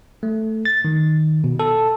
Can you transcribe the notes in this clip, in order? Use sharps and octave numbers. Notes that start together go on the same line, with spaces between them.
A3
A6
D#3
B2
A4